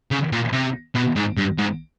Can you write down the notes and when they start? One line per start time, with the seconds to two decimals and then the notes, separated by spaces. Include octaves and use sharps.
0.11 C#3
0.32 A#2
0.53 C3
0.95 B2
1.16 G#2
1.37 G2
1.58 G#2